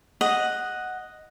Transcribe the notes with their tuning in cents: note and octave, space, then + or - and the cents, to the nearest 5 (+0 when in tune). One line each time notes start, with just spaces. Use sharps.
D#5 +0 F#5 +0